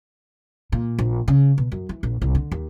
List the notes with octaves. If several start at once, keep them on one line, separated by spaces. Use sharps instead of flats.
A#2
A#1
C#3
B2
F#2
E3
A#1
C2
D3
D#2